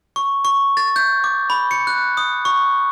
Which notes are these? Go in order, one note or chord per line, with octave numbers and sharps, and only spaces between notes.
C#6
C#6
A6
G6
D6
B5
C#7
F#6
D#6
C#6